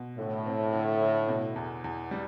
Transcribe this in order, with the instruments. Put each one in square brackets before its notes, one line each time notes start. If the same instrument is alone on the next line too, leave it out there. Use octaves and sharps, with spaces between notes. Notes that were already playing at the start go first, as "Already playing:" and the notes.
Already playing: [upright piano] B2
[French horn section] A2 [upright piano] D3
[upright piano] C4
D3
D3
B2
E2
E2
G3